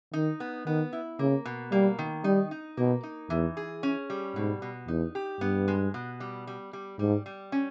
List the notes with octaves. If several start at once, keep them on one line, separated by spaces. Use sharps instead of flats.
D#3 D#4
B3
D#3 B3
E4
C#3 A#3
B2
G3 A#3
D#3
G3 D#4
D#4
B2 A#3
D#4
E2 E3
G#4
C#4
G3
G#2 B2
B2
E2 D#4
G4
G2 B3
G#3
B2
G3
G3
G3
G#2 G3
G3
C#4